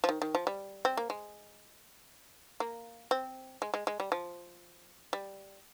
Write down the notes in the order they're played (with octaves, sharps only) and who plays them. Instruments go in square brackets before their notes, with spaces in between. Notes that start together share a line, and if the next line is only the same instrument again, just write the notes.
[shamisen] F3
D#3
D#3
F3
G3
C4
A#3
G#3
A#3
C4
G#3
G#3
G#3
G3
F3
G3